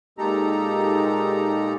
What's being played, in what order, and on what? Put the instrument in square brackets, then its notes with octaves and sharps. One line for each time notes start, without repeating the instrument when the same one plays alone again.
[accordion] A#2 G#3 D#4 G4 A4 A#5